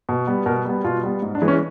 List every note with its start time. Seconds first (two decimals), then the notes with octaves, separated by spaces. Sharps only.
0.09 B2
0.27 G3 B3
0.46 B2 A#4
0.65 G3 B3
0.84 B2 F4
1.03 G3 B3
1.22 G#2
1.35 D4
1.42 E3 G#3
1.48 C#4